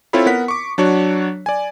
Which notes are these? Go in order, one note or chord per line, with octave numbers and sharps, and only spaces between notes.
C4 E4 F4 A4 C#5 B5
B3 A#4 F#5 B6
C#6 D6
F#3 D4 F#4 C#5
D5 G#5